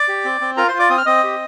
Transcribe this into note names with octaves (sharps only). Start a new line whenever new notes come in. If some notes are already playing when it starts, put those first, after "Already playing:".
Already playing: D5 D6
G4
C4
C4
F4 A#4 A#5
C5 C6
F4
D5 D6
C4 D#6
F6
C4 D#5 D#6
G4